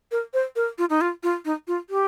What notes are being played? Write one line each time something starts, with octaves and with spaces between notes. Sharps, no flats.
A#4
C5
A#4
F4
D#4
F4
F4
D#4
F4
G4